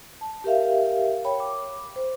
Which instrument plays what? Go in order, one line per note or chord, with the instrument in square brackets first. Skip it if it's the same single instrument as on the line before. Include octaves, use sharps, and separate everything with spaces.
[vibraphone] A5
G4 A#4 E5 F5
C#5 G5 B5
D6
C5